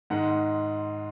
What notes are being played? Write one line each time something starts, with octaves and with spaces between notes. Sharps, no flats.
G#2 D#3 G#3 F#5